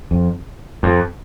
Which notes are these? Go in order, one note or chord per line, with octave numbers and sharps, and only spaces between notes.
F2
F2